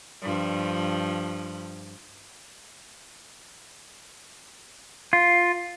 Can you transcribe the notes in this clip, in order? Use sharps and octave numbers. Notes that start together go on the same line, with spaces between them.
G2 F3
F4